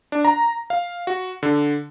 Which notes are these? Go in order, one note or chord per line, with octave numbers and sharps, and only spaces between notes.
D4
A#5
F5
F#4
D3